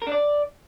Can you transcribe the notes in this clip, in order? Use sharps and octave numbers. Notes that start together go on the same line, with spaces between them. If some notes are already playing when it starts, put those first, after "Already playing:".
A#4
D4
D5